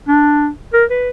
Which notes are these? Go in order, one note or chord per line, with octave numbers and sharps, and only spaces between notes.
D4
A#4
B4